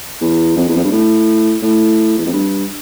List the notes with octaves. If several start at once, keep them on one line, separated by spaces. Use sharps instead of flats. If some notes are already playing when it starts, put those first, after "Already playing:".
E2
F2
E2
F2
G2
A2
A2
E2
F2
G2